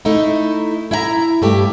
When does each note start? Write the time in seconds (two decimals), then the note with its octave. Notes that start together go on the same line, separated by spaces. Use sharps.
0.05 A3 D#4 E4
0.91 E4 E5 F#5 A#5
1.42 G2 A3 G4